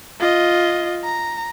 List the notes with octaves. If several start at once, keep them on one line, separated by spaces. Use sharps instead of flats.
F4 D#5
A#5